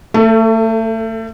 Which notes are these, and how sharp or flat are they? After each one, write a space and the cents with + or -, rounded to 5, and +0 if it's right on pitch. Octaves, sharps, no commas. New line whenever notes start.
A3 +30 A4 +0